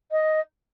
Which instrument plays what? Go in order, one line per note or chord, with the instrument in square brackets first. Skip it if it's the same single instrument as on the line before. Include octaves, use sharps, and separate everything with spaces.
[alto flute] D#5